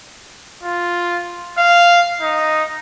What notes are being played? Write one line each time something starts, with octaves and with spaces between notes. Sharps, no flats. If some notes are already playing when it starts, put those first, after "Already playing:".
F4
F5
D#4